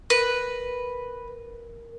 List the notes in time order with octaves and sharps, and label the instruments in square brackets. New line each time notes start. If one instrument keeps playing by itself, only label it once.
[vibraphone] A#4 [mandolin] B4